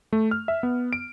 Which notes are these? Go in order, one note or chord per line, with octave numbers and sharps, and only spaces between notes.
A3
F6
E5
B3
D7